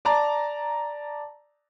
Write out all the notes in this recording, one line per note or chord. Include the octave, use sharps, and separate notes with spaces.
D5 A5 A#5